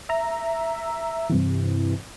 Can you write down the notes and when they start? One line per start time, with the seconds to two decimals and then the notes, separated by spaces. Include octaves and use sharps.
0.09 E5 A#5
1.30 G2 C3 E3